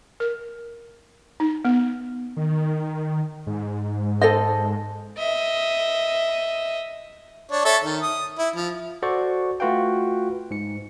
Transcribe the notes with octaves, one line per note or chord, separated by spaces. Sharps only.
A#4
D#4
B3
D#3
G#2
A4 C5 D#5
D#5 E5
D4 C#5
A4 C#5 E5
D#3
D#6
E4
F3
F#4 A4 C5 D5 C#6
A3 F4 F#4 B4 F5 G5
G#2 C#7